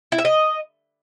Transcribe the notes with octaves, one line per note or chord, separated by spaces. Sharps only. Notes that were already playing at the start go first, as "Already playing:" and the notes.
E4
E5
D#5